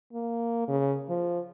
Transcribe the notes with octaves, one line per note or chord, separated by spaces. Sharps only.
A#3
C#3
F3